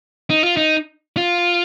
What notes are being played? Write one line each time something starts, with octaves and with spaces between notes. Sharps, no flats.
D#4
F4
D#4
F4